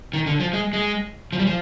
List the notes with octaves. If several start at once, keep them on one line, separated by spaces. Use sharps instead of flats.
D#3
D3
F3
G#3
G#3
F3
G3
F3